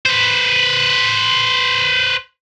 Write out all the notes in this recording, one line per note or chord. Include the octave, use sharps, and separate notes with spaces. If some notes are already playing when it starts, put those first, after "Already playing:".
B4 C5